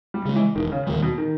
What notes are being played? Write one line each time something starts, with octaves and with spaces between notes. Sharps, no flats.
G3
C#3 G#3
E3
E1 D#3
C#3
D#2 A#2 D#3 G3
B2
D#3